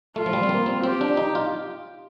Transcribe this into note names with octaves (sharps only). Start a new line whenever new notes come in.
A3 F4
F3
G3
C4
A#3
C4
C4 G4
D4
D#4
F4